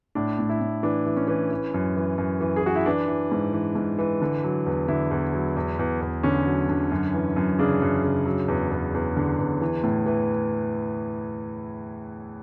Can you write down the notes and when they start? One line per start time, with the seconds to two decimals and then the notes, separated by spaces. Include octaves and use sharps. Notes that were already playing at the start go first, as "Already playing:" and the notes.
0.15 A2 D4
0.39 A2
0.49 E4
0.61 A2
0.83 E3 D4
1.06 E3
1.17 C#4
1.28 E3
1.51 E3
1.74 F#2
1.96 E3
2.18 F#2
2.41 E3
2.56 G#4
2.63 E3 F#4
2.76 E4
2.86 E3 D4
3.08 E3
3.32 G#2
3.53 E3
3.75 G#2
3.98 E3
4.22 D3
4.44 F#3
4.66 E2
4.88 D3 E4
5.11 E2
5.34 F#3
5.56 E2
5.79 E2
6.01 E2
6.23 D3 C#4
6.46 F#3
6.69 D3
6.91 F#2
7.14 E3
7.36 F#2
7.59 C#3 D4
7.82 F#2
8.04 C#3
8.26 F#3
8.48 E2
8.71 E2
8.94 E2
9.17 D3
9.39 E2
9.61 E3
9.83 A2
10.06 E3